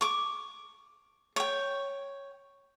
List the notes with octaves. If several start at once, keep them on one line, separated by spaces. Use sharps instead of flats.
C#6 D6
C#5 G5